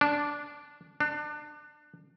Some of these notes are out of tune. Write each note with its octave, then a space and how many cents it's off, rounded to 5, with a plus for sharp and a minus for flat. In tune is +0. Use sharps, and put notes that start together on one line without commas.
D4 -10
D4 +25